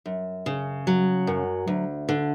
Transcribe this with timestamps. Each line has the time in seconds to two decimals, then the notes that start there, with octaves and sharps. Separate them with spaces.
0.06 F#2
0.46 C#3
0.87 F#3
1.27 F#2
1.67 D2
2.09 D3